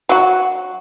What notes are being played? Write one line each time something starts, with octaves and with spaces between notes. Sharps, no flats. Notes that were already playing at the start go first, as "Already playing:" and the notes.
F#3 F#4